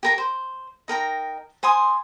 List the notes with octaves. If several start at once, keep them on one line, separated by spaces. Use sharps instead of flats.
G4 A#4 A#5
C5
D#4 A#4 G5 A#5
C5 G#5 C6 D#6